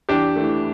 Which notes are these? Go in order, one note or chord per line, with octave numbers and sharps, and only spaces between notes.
E2 D4 G4
E3 A3